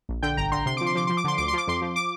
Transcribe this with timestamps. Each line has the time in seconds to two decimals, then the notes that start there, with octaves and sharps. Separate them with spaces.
0.09 A#1
0.23 D3 G5
0.37 G1 A#5
0.52 D3 C6
0.66 C3 C6
0.77 F3 D6
0.86 C6
0.95 F3 D6
1.07 F3 C6
1.17 D6
1.24 D3 C6
1.38 D2 D6
1.48 C6
1.53 F3 D6
1.67 F2 C6
1.81 F3
1.96 D6